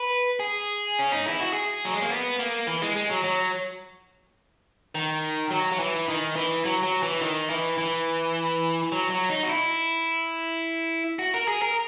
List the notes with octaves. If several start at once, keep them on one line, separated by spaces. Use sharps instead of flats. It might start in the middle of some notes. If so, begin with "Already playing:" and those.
Already playing: B4
G#4
C#4
D#4
E4
F#4
G#4
F#3
G#3
A#3
B3
A#3
E3
G#3
G#3
F#3
F#3
D#3
F#3
F#3
E3
D#3
E3
F#3
F#3
E3
D#3
E3
E3
F#3
F#3
D#4
F#4
E4
F#4
A#4
G#4
A#4